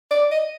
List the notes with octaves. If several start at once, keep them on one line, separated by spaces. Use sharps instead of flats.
D5
D#5